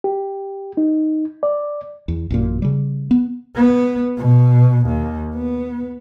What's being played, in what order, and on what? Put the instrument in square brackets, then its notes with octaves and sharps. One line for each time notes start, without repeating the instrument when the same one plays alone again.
[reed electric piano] G4
D#4
D5
[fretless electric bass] E2
A1 F#2 A#2
C#3 G3
B3
[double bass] B3
B2
D#2
B3